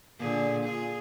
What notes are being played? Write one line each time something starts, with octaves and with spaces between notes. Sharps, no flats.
A#2 D3 G#4
F4 G#4